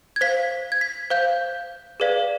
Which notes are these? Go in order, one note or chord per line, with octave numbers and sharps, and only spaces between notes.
G#6
C5 F5 B6
G#6
B6
C5 F5 G6
G#4 B4 D5 F5